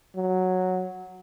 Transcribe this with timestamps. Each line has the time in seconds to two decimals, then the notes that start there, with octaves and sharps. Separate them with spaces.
0.16 F#3